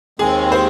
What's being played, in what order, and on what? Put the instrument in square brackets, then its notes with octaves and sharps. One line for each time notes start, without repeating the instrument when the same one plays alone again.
[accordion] D#2 D#3 G#3 C4 [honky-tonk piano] G#4
[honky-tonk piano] C5